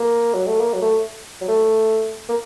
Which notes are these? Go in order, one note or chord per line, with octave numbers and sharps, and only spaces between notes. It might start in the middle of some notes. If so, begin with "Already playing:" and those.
Already playing: A#3
F#3
A3
A#3
F#3
A3
F#3
A3
A#3